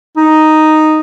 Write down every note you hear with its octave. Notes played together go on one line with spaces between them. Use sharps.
D#4